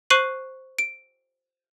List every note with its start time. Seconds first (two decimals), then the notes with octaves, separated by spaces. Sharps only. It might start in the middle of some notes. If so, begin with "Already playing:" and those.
0.10 C5 C#6 F#6 C7 D#7 F#7
0.79 D7